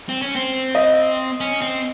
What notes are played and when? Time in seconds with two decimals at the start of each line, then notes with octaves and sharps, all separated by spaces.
0.09 C4
0.22 C#4
0.35 C4
0.75 D#5
1.40 C#4
1.61 C4